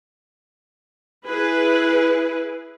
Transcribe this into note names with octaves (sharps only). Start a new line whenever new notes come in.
E4 G#4 B4